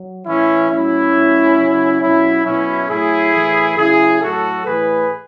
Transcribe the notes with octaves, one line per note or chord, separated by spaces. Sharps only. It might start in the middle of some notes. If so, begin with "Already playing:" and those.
Already playing: F#3
A2 E3 C#4 E4
A2 F#3 C#4 E4
A2 F#3
C#3 F#3
B2 F#3 C#4 E4
B2 F#3 C#4 E4
A2 F#3 E4 G#4
A2 E3
C#3 F#3 E4 G#4
A2 F#3 F#4 A4
A2 E3 G#4 B4